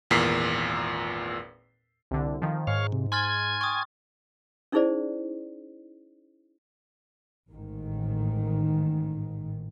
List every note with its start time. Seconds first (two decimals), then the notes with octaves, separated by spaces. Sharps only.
0.11 G#1 E2 A#2 A#4 B6 C7
2.11 C2 D3
2.42 D#3 F3
2.67 G#2 C#5 F5
2.92 C3
3.12 G#5 C6 F6 G#6 A6
3.61 G5 C#6 D#6
4.72 C#4 D#4 E4 G#4 C5 D5
7.49 A1 G#2 D#3